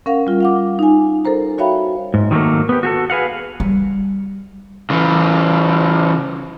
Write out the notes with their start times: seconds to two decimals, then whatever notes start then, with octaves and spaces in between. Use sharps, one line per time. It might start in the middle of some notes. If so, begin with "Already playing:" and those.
0.06 C#4 A#4 F5 F#5
0.27 G3 F4
0.40 F5 F#5 D6
0.79 D#4 G#5
1.25 A4 A#4 C5 A#5
1.58 F#4 C#5 E5 F5 G5 B5
2.14 G#2
2.31 D#3 F#3 G3 A3 A#3
2.69 B3 G4
2.83 F#4 G4 A4
3.10 G#4 B4 F5 F#5
3.60 G3
4.90 C#3 E3